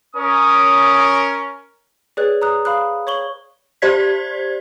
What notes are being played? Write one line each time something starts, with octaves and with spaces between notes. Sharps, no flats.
C#4 A#4 D#6
G#4 B4 C#5 D5 F#6
A#5 D#6 F#6
F5 B5 D#6 F#6
C#5 C#6 F#7 G7
G4 C5 D5 G#6 B6